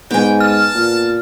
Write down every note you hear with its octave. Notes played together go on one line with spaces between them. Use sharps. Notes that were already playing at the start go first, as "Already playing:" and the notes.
G#2 B3 G5 G#5
A5 F6
A#2